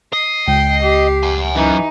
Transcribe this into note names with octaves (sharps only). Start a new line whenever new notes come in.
D#5 C7
C#2 G5
G4
F#5 G#5
F#2 E3 D#4